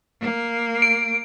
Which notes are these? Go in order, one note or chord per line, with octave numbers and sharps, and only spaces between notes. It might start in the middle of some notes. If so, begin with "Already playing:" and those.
A#3
D7